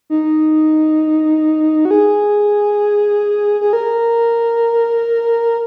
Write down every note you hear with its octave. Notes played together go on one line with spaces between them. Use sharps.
D#4
F#4
G#4
G#4
A#4